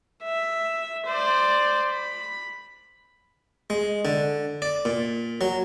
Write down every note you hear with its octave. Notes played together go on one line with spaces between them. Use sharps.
E5
C5 D5
B5
G#3
D3
D5
A#2
F#3